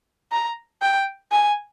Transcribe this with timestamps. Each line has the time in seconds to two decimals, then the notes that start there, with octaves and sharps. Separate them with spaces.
0.32 A#5
0.82 G5
1.32 G#5